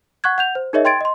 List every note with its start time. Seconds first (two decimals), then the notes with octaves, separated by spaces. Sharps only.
0.24 F#5 C#6 F#6 G#6
0.38 F#5 G6 F7
0.55 C5
0.73 D#4 G#4 A#4 C#5 D#5 E5
0.85 G5 C6 G#6 A6 D7
1.01 D#5 C6